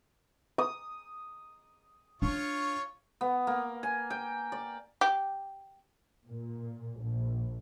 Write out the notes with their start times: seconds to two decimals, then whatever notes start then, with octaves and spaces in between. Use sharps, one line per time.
0.58 D#6
2.22 D4 F4 C#5 C#6
3.21 B3
3.47 A#3
3.83 G#5
4.10 G5
4.52 D5
5.01 G4
6.26 A#2
7.02 A#1